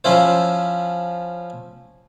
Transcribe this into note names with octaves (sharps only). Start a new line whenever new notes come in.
F3 C#4 E4 C5